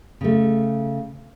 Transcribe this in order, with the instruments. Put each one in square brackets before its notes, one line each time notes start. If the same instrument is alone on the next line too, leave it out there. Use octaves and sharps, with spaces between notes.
[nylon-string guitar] C#3 A3